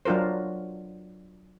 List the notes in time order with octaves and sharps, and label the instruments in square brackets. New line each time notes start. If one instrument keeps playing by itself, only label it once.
[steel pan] F#3 D4 F4 A#4 C5